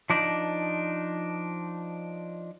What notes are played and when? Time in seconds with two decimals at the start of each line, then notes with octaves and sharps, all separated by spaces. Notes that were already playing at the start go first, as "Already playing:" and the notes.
0.10 F3 D4 D#4